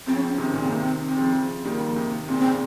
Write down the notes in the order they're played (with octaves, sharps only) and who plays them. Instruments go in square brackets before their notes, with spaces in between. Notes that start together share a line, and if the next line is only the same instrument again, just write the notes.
[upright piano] C#3 F3 [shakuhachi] C4
[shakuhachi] C#4
C4
C#4
[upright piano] C3 D#3
[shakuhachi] C4
[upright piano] A#2 C#3 [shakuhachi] C#4
[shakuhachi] C4
[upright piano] C3 D#3 [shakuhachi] A#3
[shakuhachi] C4
C4
[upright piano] C#3 F3
C#3 F3
[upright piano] D#3 G3 [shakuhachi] A#3
[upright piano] C#3 F3
C3 D#3
[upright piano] A#2 C#3 [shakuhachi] C4
[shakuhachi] C4
[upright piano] A#2 C#3